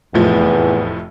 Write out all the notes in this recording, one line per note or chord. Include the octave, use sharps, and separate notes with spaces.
F1 E2 A2 F3